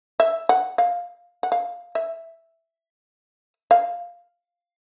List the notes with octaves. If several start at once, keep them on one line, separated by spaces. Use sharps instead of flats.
E5
F#5
F5
F#5
F5
E5
F5